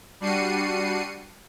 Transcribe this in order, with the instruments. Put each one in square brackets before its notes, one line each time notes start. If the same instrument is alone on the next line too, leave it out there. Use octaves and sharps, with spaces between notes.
[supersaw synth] G3 D4 F#4 C7 C#7 D#7